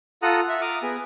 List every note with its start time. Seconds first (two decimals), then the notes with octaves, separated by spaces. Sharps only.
0.22 F4 A4 F#5 A#5 D#6
0.49 E5
0.62 A#5 D6 D#6 F6
0.83 B3 G#4